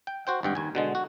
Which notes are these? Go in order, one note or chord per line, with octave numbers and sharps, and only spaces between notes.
G5
F#4 C5 G5
G#1 G2 G5
D#2 G#5
B2 D3 G#3
F#4